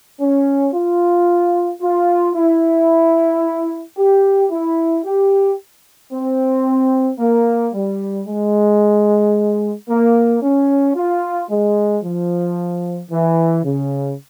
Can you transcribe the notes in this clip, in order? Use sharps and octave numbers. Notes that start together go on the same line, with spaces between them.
C#4
F4
F4
E4
G4
E4
G4
C4
A#3
G3
G#3
A#3
C#4
F4
G#3
F3
E3
C#3